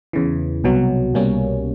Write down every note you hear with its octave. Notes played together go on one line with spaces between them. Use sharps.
E2 C#3 E3
C2 B2 F#3
C2 B2 G3 A#3 C#4